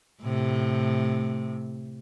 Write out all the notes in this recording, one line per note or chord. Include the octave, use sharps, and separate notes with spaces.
A2 C3